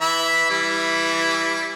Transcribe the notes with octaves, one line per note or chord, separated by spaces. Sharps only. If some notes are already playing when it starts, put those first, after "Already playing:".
E3 E5 B5
E3 G3 E4